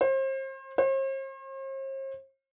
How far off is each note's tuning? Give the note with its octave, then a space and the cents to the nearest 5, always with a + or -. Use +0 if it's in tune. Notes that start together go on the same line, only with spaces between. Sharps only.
C5 +35
C5 +45